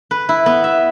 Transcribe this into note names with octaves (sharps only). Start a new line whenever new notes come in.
B4
E4
B3
E5